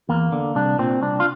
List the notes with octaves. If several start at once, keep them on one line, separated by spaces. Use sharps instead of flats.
E2 A#3
D3
C2 D4
A#2 C4
C2 D4
F4